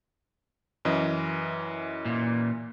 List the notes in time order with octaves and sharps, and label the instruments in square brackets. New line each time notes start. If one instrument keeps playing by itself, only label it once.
[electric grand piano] F#2 E3 D#5
[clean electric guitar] A#2